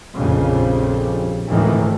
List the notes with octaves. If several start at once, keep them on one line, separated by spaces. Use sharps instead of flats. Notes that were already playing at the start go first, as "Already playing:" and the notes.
A#1 F2 C#3 G3
G#1 C#2 A2 D#3 E3